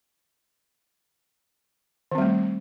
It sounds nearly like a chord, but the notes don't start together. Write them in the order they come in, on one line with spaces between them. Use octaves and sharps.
D#3 C4 G3 A3